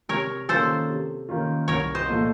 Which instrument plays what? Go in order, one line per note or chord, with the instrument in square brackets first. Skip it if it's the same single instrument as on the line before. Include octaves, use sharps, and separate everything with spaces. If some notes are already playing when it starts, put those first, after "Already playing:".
[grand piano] C3 [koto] A#4 C#5
[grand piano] D#3 A#3 C#4 F4 [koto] A4 C5
[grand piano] C3
D#3 A#3 C#4 F4
[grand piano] C2 [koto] A#4 C#5
[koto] C5 D#5
[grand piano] A#2 F3 A3